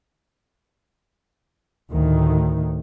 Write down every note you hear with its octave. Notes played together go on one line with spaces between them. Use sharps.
D2 A2 D#3